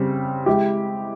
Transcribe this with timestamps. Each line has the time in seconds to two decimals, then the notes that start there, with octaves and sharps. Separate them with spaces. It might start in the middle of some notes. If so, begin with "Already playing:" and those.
Already playing: C#3 G3 C4
0.46 G#3 E4 G4